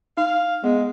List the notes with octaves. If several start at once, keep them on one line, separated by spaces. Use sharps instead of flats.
D#4 F5
G#3 B3